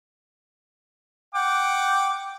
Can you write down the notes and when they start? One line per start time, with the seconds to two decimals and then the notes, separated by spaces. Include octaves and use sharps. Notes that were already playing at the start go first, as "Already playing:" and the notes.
1.35 F#5 G5 D6